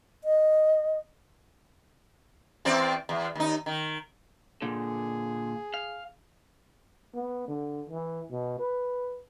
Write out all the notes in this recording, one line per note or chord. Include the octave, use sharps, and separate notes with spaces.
D#5
E2 C4 D5
E2
D#2 D#4
D#3
A#2 D3 G#4
F5
B3
D3
E3
B2
B4